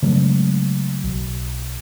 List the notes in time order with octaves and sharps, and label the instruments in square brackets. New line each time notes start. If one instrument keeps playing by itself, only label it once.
[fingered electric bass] C#3 F#3 G#3 A3
B1